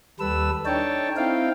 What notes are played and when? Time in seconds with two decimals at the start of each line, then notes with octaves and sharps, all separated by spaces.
0.20 D#2 G3 A4 B4 E6
0.66 D4 D#4 A4 C#5 G5 A5
1.17 C4 D#4 E4 F5 G5